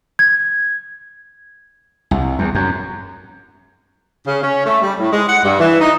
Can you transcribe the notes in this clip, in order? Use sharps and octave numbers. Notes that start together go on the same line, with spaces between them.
G#6
C2
E2
F#2
C#3
C#4
A3
G3
A2
G#3
F#5
G2
E3
D#4